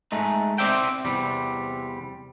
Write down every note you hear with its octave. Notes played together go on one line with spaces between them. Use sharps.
G#3 A3 D#4
C4 D5 E5 G5
E2 C3 G3